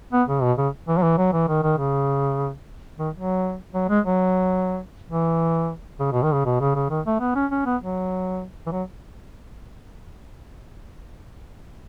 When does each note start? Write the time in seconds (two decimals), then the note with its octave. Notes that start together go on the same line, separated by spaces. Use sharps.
0.13 B3
0.28 C#3
0.42 B2
0.58 C#3
0.88 E3
0.97 F#3
1.03 E3
1.18 F#3
1.33 E3
1.48 D#3
1.63 D#3
1.78 C#3
2.99 D#3
3.14 F#3
3.74 F#3
3.89 G#3
4.05 F#3
5.09 E3
6.00 C#3
6.12 B2
6.23 D#3
6.34 C#3
6.45 B2
6.61 C#3
6.75 C#3
6.90 D#3
7.06 A3
7.20 B3
7.35 C#4
7.51 C#4
7.66 B3
7.82 F#3
8.66 E3
8.72 F#3